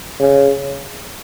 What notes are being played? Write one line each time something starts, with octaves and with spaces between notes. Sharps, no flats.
C#3